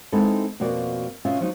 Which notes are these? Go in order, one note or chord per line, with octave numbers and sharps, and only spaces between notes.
G#3 B3 C4 D#4 E4 A4
F2 B2 A#3 F#4 D5
B2 C#4 F4 D#5 E5
F3 F#3 D#4